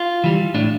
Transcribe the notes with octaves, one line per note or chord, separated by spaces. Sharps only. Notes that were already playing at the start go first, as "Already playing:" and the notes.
Already playing: F4
E3 G3
A2 D4